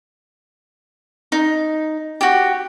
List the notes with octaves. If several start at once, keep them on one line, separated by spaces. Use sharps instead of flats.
D#4
F#4 G4